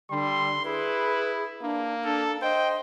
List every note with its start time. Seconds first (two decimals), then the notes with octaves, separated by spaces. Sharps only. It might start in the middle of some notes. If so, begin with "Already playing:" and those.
0.11 D3 G3 C6
0.65 E4 G#4 B4
1.62 A#3 D4
2.05 D4 A4
2.42 C5 D#5 G5